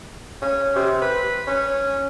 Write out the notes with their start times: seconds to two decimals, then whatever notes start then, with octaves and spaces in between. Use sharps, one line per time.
0.42 C#4
0.76 C3
1.02 B4
1.47 C#4